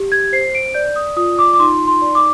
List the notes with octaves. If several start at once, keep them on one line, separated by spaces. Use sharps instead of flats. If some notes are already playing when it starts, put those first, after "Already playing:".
Already playing: G4
G#6
C5 C7
D7
D5 G6
D#6
F4 D#6
D6
D6
D#4 C6
C6
D5
D6